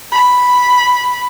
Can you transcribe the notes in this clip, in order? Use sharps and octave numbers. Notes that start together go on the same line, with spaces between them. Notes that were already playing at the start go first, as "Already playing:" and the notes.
B5